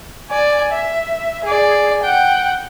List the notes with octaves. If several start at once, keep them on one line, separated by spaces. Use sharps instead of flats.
D5 G#5
E5
G#4 D5
F#5 G5